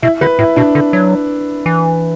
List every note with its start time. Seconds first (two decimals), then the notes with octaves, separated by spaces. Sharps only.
0.02 B2 E4
0.21 D3 B4
0.39 A2 E4
0.56 B2 D4
0.75 D3
0.93 F#3
1.66 E3